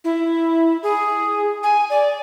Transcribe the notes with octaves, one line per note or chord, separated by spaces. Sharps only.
E4
G#4
G#5
D5